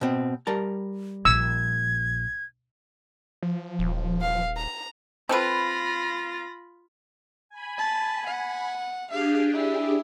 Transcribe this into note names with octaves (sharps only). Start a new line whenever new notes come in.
B2 C4
G3 A#4 A5
A#1 E6 G#6
F3
D#1
F5
A#5
C4 F4 A4 B4 B5 A#6
G#5 B5
A5
F#5
D4 G4 G#4 F5
E4